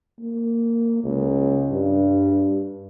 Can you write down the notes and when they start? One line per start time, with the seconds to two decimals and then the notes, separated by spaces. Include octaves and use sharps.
0.20 A#3
1.04 C#2
1.71 G2